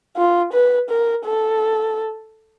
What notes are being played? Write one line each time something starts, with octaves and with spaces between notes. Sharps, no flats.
F4
B4
A#4
A4